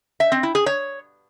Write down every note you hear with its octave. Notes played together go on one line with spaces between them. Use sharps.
E5
C4
E4
G#4
C#5